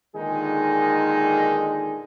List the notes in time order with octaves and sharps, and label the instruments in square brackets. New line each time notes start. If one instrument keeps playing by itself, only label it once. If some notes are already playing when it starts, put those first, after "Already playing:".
[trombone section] A#2 D3 D#3 G#3 D#4 G#4